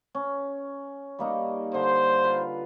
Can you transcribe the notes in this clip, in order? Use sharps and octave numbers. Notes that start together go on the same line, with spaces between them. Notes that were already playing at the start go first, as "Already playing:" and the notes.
C#4
G3 A#3 D#4
D3 C5
F4 B4 F5